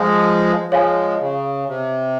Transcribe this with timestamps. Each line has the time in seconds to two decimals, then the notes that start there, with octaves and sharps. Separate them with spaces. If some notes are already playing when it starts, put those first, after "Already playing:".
Already playing: F3 G#3
0.72 F3 G#3 C#5 F5 G#5
1.21 C#3
1.69 C3